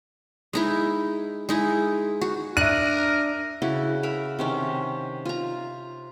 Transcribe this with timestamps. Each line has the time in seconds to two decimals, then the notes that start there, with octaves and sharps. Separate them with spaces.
0.53 G#3 D#4 E4
1.49 G#3 D#4 E4
2.21 F#4
2.57 D4 A#4 E5 F#6 D#7
3.62 C#3 E4 F#4
4.03 A#4 E5 B5
4.39 C3 D#3 C#4
5.25 F4 A#5